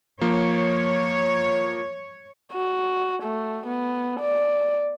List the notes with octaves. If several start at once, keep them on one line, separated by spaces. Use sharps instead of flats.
F3 A#3 C#5
F#4
A3
B3
D5